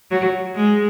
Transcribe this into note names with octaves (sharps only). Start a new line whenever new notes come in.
F#3
G#3